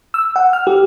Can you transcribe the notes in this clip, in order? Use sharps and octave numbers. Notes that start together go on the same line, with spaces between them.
E6
F#5
F6
G4